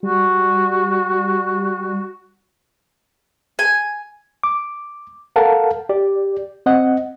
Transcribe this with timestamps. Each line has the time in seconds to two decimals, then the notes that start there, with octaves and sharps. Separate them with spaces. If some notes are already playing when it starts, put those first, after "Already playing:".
0.03 G3 F#4
3.59 G#5
4.43 D6
5.36 A4 A#4 F5 F#5 A5
5.89 G4 D5
6.66 C4 D#5 F#5